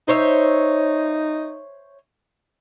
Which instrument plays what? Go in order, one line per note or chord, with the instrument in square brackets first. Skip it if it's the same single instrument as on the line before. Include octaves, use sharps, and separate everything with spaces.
[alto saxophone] D#4 [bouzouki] C5 C#5 E5